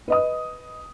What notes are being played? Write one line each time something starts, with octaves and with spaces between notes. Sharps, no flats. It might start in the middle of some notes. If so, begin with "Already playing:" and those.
B4 D#5 D#6